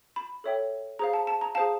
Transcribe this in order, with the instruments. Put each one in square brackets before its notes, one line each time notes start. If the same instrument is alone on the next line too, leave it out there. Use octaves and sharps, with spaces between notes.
[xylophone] B5
A4 C#5 E5 G5
G#4 C5 F5 A#5
A5
A5
A#5
G#4 C5 F5 A5